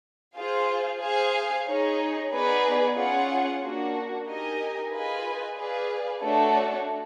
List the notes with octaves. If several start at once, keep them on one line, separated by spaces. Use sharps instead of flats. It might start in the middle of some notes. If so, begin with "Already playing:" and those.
F4 G#4 C5 F5
G#4 C5 F5 G#5
D#4 G#4 C#5
B3 D#4 G#4 B4 D5
C#4 F4 G#4 C#5 F#5
A#3 D4 F#4
D#4 G4 A#4 D#5 G#5
F4 G#4 B4 D#5 G#5
G#4 B4 D5 F5
A3 D4 F#4 A4 C#5